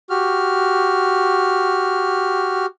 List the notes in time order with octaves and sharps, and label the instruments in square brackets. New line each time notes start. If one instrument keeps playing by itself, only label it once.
[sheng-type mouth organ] F#4 G4 F6